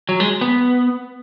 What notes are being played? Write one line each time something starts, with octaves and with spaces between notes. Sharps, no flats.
F#3
G#3
B3